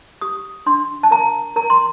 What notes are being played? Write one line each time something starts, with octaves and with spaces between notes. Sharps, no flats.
G4 D#6
D4 C6
A5
A#4 A#5
A#4 A#5
C6